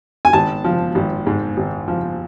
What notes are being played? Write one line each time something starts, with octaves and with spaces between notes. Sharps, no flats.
G#5
G#1 A5
F3
G#1
G#2
G#1
F3